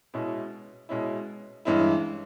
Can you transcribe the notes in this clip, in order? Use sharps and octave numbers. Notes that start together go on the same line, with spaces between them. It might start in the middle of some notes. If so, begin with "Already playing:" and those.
B2 G#3 C#4 E4
B2 G#3 C#4 E4
G2 E3 G#3 C#4 E4